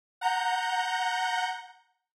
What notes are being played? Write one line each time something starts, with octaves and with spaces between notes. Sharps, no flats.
F#5 A#5 G6